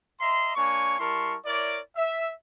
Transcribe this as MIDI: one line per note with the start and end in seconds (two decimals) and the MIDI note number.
0.21 0.52 75
0.21 0.52 76
0.21 0.52 82
0.21 0.52 84
0.55 0.96 58
0.55 0.96 62
0.55 0.96 73
0.55 0.96 80
0.55 0.96 85
0.99 1.35 55
0.99 1.35 64
0.99 1.35 70
0.99 1.35 81
0.99 1.35 84
0.99 1.35 85
1.46 1.78 64
1.46 1.78 70
1.46 1.78 73
1.46 1.78 74
1.96 2.31 76